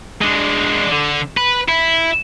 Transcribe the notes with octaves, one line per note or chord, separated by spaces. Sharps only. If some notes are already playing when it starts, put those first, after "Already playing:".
G#3 D4
D3
B4
E4